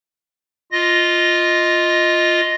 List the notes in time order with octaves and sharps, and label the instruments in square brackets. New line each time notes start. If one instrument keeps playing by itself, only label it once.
[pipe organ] F4 D#5 A#6